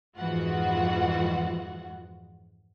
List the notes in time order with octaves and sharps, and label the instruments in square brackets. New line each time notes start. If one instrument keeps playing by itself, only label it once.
[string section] F2 G#2 E3 F4 F#4 F#5